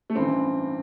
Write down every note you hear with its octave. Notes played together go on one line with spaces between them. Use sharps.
A3
A1 G2 E3 C4